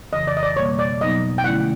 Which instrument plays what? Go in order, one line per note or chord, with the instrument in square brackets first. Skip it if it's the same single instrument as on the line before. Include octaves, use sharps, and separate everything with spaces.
[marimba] F2 C#3 E3 [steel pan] D#5
[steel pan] D5
D#5
D5
[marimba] B2 G3 A#3 [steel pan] C#5
[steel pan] D5
[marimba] B2 F#3 B3 D#4 [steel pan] D#5
[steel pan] G5
[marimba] D3 F3 A3 C#4 E4 [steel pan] F#5